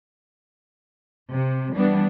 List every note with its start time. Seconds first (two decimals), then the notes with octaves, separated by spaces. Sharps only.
1.32 C3
1.76 E3 G3 B3 D4